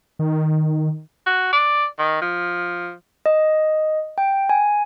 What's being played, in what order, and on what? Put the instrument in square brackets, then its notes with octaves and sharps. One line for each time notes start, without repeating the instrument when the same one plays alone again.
[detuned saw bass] D#3
[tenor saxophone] F#4
D5
D#3
F3
[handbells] D#5
G5
G#5